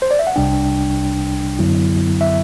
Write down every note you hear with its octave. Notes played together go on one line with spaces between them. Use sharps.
C5
D5
E5
F#5
C2 C3 G3 D4 G5
F#2 D3 F#3 B3 E4
E5